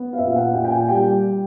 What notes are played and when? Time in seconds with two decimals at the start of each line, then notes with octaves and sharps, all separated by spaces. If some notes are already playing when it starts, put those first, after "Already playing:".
Already playing: B3
0.13 F5
0.18 A#2 E5
0.31 F5
0.36 F#5
0.54 A#2 G5
0.65 G5
0.71 G#5
0.88 G3 G5